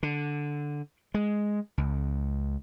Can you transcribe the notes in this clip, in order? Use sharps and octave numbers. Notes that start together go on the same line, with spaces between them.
D3
G#3
C#2